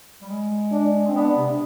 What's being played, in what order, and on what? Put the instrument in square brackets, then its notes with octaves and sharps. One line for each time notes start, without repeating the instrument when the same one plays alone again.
[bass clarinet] G3
G#3
[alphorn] D4
[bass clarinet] C4
[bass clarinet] B3 [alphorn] D4
[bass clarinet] C3